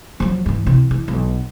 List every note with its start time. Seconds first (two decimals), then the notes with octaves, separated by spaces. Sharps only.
0.20 F3 F#3
0.46 G2 E3
0.66 C3 E3
0.91 E3
1.08 B1